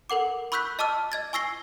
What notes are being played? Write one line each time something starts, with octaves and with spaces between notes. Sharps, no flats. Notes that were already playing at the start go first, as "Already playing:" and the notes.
A4 A#4 F#5 D6
B5 C#6 E6 F#6 G6 B6
D#5 A5 D6 E6 F6
D#5 G#6 A6
G#5 C#6 E6 A#6 C7 G7